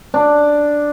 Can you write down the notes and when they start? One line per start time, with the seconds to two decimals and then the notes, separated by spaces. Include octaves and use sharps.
0.14 D4